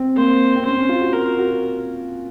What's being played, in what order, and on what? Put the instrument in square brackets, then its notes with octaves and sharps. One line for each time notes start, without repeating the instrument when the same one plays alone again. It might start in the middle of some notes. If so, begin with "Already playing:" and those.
Already playing: [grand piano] C4
[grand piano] A#3 [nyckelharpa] C5
[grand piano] C4
[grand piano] C#4 [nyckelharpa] C5
[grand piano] C#4
F4
F#4
[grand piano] F#4 [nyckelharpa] A#4
[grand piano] F#4